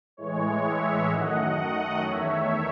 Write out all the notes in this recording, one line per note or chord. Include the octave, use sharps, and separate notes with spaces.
A2 E3 G#3 C#5
C#5 E5
F#2 D#3 A3 D#5 F#5
E2 D#3 A3 C#5 E5